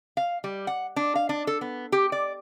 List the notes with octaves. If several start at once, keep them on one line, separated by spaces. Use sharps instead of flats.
F5
G3
F#5
D4
F5
D4
A4
B3
G4
D5